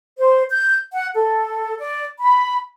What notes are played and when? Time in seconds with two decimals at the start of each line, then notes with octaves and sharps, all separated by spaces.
0.19 C5
0.51 G6
0.92 F#5
1.15 A4
1.79 D5
2.20 B5